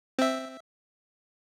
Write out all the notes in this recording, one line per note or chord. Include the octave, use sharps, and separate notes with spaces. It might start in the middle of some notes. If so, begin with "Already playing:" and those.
C4 E5